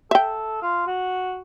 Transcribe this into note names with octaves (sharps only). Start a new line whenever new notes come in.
A4 E5 G5
F4
F#4